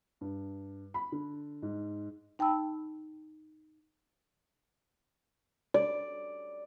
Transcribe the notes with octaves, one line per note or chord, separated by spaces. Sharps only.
G2
B5
D3
G#2
D#4 G5 A5 B5 E6
D5